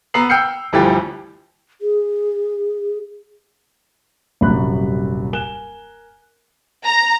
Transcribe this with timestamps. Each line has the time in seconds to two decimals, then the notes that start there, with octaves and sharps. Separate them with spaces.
0.14 B3 A#5 E6 C7 F#7
0.29 G5 E6 F6 G6 C7 C#7
0.73 G1 D2 E3 F3 G4 A6
1.81 G#4
4.41 D#1 C2 F#2 F#4 B5 F#6
5.33 A#4 G#5 F#6 E7 G7
6.85 A#5